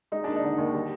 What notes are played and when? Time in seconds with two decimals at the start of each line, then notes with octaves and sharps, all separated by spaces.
0.12 G#3 D#4
0.24 D#2 D4
0.36 D#4
0.43 D3
0.58 D#2
0.74 G3